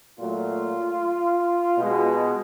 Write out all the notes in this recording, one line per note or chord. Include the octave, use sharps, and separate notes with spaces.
A#2 F#3 A3 F4
B2 G#3